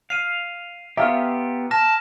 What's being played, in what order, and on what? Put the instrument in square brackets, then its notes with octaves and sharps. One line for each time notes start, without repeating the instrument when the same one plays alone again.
[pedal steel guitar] F5 [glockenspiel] C7 D#7
[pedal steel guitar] B3 F4 G4 [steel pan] E5 F5 C#6 [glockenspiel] A#5 E6
[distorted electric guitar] A5 [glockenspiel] F6 A#6 E7